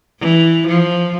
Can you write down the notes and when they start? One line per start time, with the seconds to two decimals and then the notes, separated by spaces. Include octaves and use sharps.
0.20 E3
0.67 F3